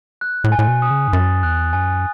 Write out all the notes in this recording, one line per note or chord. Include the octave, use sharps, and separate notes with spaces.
F#6
A2
G#5
A2
B2
D#6
C#3
G#2
F#2 A6
E2 F#6
F#2 G#5